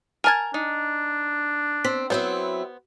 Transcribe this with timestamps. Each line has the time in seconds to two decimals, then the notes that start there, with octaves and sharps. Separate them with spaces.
0.24 A#4 G#5 A5 F6 G#6
0.54 D4 D#4
1.85 C4 B6
2.10 F#3 B3 C4 E4 C5